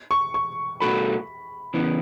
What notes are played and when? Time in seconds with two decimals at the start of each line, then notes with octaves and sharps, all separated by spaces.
0.11 C#6
0.34 C#6
0.80 B2 A3 F#4 A4 B5
1.74 C#3 E3 B3